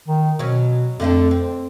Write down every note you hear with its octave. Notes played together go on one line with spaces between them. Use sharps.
D#3
B2 F#3 C#4
F2 D3 A3 D4
C4